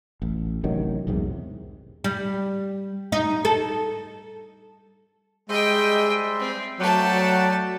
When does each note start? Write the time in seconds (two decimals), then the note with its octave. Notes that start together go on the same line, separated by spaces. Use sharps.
0.22 A1
0.64 A1 C3 D#3 F#3
1.07 B1 E2 G#2 C3
2.04 G3
3.12 D#4
3.45 A4
5.49 G3 G#3 C5 D#5 E5 G5
6.39 C4
6.80 F#3 A3 D5 F#5 G5 A5